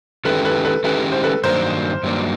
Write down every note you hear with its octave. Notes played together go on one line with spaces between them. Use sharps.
D#3 G#3 C#4 E4 G4 A4 B4
A4 B4
A4 B4
D#3 G#3 C#4 E4 G4 A4 B4
C5
A4 B4
G2 D#3 F#3 A#3 D4 A#4 C5
G2 D#3 F#3 A#3 D4